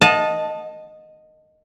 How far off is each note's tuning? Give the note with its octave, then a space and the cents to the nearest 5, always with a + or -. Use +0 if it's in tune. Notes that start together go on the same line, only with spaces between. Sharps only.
D#5 -5 F#5 -45 A5 +0